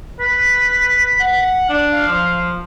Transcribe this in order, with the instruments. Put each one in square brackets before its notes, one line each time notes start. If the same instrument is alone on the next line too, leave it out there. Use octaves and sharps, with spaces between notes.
[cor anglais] B4 [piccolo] B6
[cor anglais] F#5
D4
[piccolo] F5
[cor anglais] F3